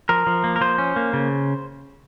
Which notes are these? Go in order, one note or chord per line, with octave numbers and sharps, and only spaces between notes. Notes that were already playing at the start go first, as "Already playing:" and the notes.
F3 A#4
F3
A#3
A#4
F3 C5
C#4
A#3
C#3